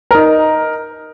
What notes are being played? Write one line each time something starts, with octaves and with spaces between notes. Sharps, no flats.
D#4 A#4